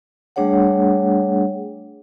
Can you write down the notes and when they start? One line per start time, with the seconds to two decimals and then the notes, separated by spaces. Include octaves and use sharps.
0.36 G3 A3 D4 G#4 C#5 F#5